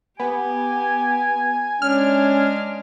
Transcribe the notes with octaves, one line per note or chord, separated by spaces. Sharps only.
B3 G4 G#5
G#3 C#4 D4 F6